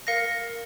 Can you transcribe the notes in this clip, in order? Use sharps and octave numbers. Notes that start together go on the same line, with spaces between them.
A#4 F5 A#6 C#7